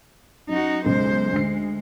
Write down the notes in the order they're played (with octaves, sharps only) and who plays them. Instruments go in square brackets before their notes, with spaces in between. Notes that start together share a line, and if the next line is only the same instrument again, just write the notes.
[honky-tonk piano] F#2 [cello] D#4 F#4
[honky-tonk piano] F#1 B1 [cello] G#3 C5
[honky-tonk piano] D2 C7 [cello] G#3